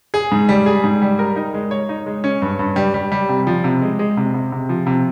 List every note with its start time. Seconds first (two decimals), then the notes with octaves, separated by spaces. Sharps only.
0.14 G#4
0.32 G#2
0.49 G3
0.66 G#4
0.84 G#2
1.02 G3
1.19 A#4
1.36 D#4
1.54 G#3
1.71 C#5
1.89 D#4
2.06 G#3
2.24 C#4
2.42 G2
2.59 G2
2.76 G3
2.94 G3
3.12 G3
3.29 C3
3.47 F3
3.64 C3
3.82 G#3
3.99 G#3
4.17 C3
4.34 C3
4.52 C3
4.69 F3
4.87 C3